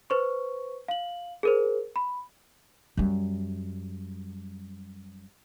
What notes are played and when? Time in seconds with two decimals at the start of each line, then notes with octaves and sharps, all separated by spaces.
0.10 B4 C5 C#6
0.88 F5 F#7
1.43 G#4 A#4 C5
1.96 B5
2.97 F#2 G3